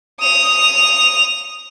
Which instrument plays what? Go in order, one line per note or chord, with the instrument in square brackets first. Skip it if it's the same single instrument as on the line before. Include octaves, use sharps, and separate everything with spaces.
[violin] D#6 F7